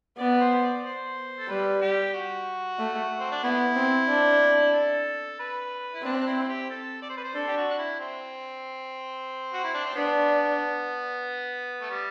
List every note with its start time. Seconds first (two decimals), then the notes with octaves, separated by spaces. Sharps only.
0.18 B3 D5
0.30 B4
0.40 C5
0.62 D5
0.83 C5
1.39 A4
1.49 G3 B4
1.81 G4
2.14 F#4
2.79 A3
3.19 C4
3.31 D4
3.44 B3 E4
3.76 C4
4.09 D4
4.74 A4
5.40 B4
5.94 E4
6.04 C4 D4
6.21 D4
6.27 E4
6.48 G4
6.70 A4
7.02 D5
7.10 C5
7.17 B4
7.24 C5
7.35 D4 A4
7.48 G4
7.57 F#4
7.70 D4
7.78 E4
7.99 C4
9.53 F#4
9.64 E4
9.74 D4
9.85 C4
9.95 B3 D4
11.81 A3
11.91 G3